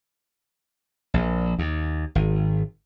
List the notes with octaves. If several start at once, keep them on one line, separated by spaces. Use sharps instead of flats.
A#1
D#2
G#1